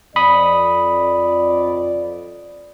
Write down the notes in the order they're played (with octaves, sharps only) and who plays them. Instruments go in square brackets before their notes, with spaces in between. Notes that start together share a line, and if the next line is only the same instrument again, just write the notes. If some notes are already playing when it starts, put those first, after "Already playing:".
[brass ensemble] F2 D5 [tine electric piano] B5 D#6